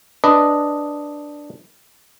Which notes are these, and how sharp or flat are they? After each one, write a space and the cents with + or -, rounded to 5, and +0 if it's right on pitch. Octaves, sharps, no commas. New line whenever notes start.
D4 +0 B4 +0 D#5 +0